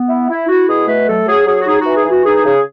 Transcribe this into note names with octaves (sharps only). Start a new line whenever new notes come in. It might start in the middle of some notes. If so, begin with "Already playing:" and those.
Already playing: B3
E4
E4
E4 F#4
B2 G#4
A3 B4
F#3 A4
F#3 G#4
F#3 G#4
F#4
D#4 G#4
F#4
E3
G#4
E3 F#4
D#4 G#4
C#3 G#4